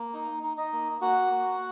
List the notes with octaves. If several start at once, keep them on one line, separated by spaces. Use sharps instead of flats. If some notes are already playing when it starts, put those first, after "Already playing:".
Already playing: A#3
D#4
D#4
D#4 D#5
A#3
A#3 F#4 F#5
A#3